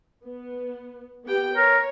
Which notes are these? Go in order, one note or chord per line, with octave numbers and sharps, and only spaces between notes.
B3
B3 G4 G5
A#4 C#5